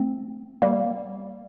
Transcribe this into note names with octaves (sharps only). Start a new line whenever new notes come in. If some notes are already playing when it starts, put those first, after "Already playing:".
Already playing: A3 C4
G3 A#3